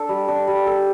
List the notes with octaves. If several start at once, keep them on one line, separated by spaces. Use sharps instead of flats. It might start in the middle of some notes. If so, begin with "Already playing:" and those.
Already playing: D4 A4
G3
D4
G3
A4